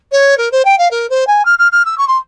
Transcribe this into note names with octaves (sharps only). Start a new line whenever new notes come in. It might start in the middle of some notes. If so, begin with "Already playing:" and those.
C#5
A#4
C5
G5
F5
A#4
C5
G#5
F6
F6
F6
E6
C#6
C6